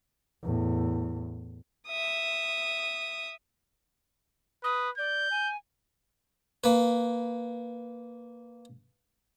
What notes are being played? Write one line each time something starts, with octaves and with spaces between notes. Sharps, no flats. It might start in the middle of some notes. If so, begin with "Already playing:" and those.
E2 A2
E5 D#6
B4 D#6
D5 G6
G#5
A#3 B4